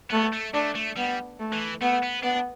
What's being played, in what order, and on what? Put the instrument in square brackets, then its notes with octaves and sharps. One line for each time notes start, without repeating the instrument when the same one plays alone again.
[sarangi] A3 [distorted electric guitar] B3
[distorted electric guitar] A3
[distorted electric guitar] A3 [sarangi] D4
[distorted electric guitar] A3
[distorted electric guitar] G3 [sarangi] B3
[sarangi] A3
[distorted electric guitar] E3
[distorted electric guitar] A3 [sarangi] B3
[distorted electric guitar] B3
[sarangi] B3 [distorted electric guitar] D4